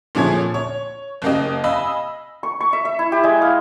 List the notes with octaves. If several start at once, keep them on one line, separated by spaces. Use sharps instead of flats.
A#2 D3 F3 G#4 C#5 G#6
C#5
F#1 C#3 A#3 G4 D#5
D#5 F5 G#5 B5 E6
C#6
C#6
E5
E5
E4
G4
G#3
F5